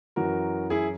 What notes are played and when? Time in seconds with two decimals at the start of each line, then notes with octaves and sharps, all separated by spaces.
0.16 F#2 E3 F#4 A#4
0.70 E4 G#4